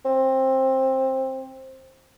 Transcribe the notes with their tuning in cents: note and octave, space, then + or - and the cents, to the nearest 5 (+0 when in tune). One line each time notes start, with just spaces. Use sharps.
C4 +15